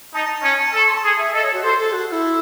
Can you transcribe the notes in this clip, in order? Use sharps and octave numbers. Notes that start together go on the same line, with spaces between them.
D#4 A5
C#4
A4
C#6
C6
A5
G#4 G#5
E5
A4 D#5
C#5
F#4
A4 C5
A4
F#4
F#4
E4